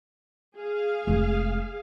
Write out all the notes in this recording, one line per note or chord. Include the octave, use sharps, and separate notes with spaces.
G#4 F5
F1 G#3